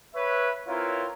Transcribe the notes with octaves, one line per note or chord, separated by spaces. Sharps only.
B4 C#5 E5
C4 E4 F4 A#4 B4 C#5